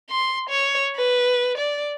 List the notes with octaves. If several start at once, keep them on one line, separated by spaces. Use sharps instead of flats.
C6
C#5
B4
D5